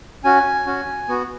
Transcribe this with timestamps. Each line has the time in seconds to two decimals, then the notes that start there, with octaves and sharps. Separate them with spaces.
0.24 C#4 F#4 G#5
0.66 C#4 F#4
1.08 B3 F#4